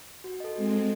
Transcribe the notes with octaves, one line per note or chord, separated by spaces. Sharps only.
F#4
A4 D#5
G#3 C4 F#4
A4 D#5